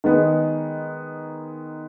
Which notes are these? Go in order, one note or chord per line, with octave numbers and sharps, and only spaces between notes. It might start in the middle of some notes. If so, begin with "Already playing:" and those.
D#3 G#3 B3 D#4